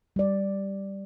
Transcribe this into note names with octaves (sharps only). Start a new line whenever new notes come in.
G3 D5